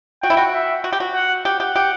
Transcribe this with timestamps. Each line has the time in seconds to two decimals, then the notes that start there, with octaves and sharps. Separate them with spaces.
0.23 F#4 G5
0.30 E4
0.37 F#4
0.53 E5
0.84 F#4
0.93 G4
1.00 F#4
1.14 F#5
1.45 G4 F#5
1.60 G4
1.76 G4